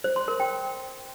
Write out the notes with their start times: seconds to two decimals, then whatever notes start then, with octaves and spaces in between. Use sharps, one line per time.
0.04 C5
0.16 C6
0.28 A#4
0.40 G5